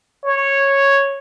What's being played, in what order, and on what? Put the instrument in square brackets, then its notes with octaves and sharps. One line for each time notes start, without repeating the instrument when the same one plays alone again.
[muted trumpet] C#5